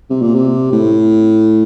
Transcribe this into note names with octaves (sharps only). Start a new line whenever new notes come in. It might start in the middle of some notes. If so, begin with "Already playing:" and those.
C3
A#2
C3
A2